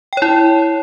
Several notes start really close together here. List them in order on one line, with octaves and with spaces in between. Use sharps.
G5 C#5 E4